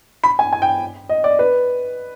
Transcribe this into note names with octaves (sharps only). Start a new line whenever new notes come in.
B5
G#5
G#5
G5
D#5
D5
B4